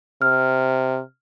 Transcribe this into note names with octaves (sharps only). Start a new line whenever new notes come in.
C3 F6